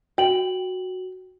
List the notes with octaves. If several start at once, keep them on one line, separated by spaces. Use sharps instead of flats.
F#4 G5 F#7